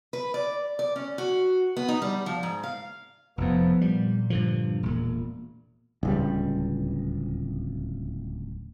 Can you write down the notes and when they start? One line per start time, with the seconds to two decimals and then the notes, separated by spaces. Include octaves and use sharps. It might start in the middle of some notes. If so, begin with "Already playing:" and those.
0.13 B4
0.34 D5
0.79 D5
0.96 C#4
1.18 F#4
1.77 B3
1.88 D#4
2.02 G3
2.26 F3
2.43 G#2
2.63 F5
3.38 F1 F2 F3 B3
3.81 A#2 G3
4.30 G2 D3 F3
4.83 E1 A#2
6.03 D1 C#2 G3